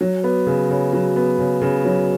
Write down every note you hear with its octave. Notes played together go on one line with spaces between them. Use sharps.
F#3
B3
C#3
C#3
F#3
B3
C#3
C#3
F#3